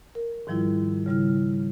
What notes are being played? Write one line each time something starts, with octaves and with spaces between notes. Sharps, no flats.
A#4
G#2 D#3 F3 G3 E4 F4
C#3 G3 E4 F6